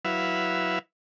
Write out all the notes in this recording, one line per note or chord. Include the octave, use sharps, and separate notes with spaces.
F#3 E4 B4 E5 F5